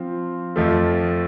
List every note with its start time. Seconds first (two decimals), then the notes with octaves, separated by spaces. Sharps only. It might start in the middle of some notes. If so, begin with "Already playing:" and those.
Already playing: F3 C4
0.56 F2 F3 A3